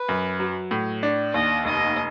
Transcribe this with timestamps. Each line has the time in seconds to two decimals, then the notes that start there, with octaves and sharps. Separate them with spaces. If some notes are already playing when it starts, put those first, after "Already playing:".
Already playing: B4
0.09 F#2
0.40 F#3
0.71 A2
1.03 D4
1.33 D#2 D#5
1.65 F1 D#5